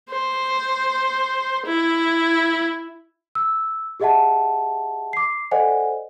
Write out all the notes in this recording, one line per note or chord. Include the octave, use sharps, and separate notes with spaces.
C5
E4
E6
G4 G#4 D#5 E5 F#5 A5
D6 C7
A4 C5 D5 D#5 F#5 G#5